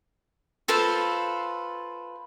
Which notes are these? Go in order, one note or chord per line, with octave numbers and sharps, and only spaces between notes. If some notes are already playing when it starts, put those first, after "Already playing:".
F4 A4 B4 C5